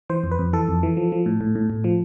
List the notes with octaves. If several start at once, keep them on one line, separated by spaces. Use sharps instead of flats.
E3 C5
F2
B4
F2
E3 A4
F2
E3
F3
F3
A2
A2
A2
A2
F3